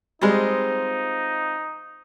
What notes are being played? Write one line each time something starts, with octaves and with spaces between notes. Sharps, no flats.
G3 G#3 C4 D#4 F4 C5